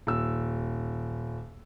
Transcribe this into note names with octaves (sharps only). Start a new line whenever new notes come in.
D#1 E6